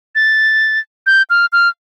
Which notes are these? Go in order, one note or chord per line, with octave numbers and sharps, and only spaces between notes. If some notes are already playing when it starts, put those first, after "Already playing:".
A6
G6
F6
F6